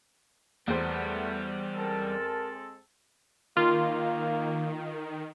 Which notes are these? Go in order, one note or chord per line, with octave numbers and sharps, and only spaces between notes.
E2 G3 A3 B3 C5
G#3 C4 A4 A#4 A5
D#3 A#3 F4